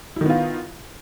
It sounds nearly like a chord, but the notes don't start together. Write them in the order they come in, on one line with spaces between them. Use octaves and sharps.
E4 D#3 B3 F4